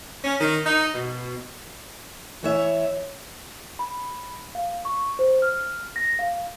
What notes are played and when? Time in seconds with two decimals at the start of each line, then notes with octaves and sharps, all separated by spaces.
0.24 C#4
0.39 D#3
0.65 D#4
0.93 B2
2.43 E3 C#5 E5
3.79 B5
4.55 F5
4.85 C#6
5.19 C5
5.42 F6
5.96 A#6
6.19 F5